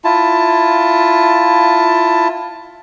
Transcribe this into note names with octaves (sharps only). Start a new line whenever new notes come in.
E4 F4 A5